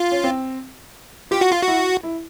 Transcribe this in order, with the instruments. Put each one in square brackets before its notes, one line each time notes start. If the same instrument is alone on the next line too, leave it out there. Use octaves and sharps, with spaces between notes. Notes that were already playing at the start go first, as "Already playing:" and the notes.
Already playing: [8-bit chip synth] F4
[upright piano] C#4
C4
[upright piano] F4 [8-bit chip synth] G4
[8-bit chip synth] F#4
F4
F#4
[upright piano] E4
E4